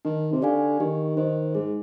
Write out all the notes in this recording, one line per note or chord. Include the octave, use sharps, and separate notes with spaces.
D#3 D#4
C3
D3 G4 D5 F5 G#5
D#3 G4
D#3 C5 D#5
G#2 G#4